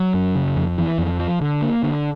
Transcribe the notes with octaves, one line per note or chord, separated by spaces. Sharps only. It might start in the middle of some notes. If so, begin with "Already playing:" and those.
Already playing: F#3
F#2
C#3
F2
E3
F2
F3
D3
A#3
D3